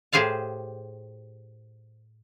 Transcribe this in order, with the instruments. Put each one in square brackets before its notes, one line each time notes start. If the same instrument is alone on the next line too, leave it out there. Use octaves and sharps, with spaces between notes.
[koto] A2 G4 G#4 C5 F5 A5